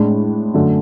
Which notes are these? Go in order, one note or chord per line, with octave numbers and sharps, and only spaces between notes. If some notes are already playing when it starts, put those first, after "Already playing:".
Already playing: A2 G#3 D4
F#2 D3 A3